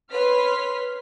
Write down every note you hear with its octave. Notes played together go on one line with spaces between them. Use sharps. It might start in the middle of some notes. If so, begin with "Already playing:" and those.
B4 C#5 C6 F6 B6